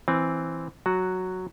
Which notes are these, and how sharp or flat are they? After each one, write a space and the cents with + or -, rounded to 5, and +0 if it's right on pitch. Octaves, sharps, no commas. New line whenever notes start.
E3 +0 C4 +0
F#3 +0 F#4 +0